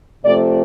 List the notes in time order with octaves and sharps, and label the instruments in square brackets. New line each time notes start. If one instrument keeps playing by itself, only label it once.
[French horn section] C3 F3 A3 C4 D5